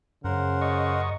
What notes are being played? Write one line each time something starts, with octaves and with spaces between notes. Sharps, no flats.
F#2 C#3 A#4 C5 F#5
D#5 C#6